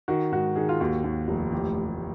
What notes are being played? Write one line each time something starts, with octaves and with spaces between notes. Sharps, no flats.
D#3 F#4
G#2 F#4
D#3 G#4
F4
D#2 F#4
D#2
F1
A1 G4